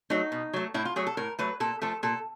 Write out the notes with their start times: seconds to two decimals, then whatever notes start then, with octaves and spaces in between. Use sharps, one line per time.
0.10 F#3 A3 D#4
0.32 B2
0.53 F#3 A3
0.74 A2 E4
0.85 F4
0.96 F#3 A3 G#4
1.07 A4
1.17 A2 A#4
1.39 F#3 A3 B4
1.60 A#2 A4
1.82 F3 A3 A4
2.03 A#2 A4